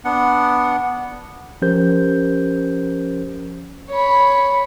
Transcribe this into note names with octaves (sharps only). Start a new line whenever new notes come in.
B3 D4 F#5
F3 C#4 G4 A#4 C5 G6
C#5 B5